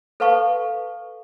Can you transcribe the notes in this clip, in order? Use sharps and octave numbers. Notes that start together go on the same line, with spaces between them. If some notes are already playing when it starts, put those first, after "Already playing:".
A4 B4 F5 A5 C#6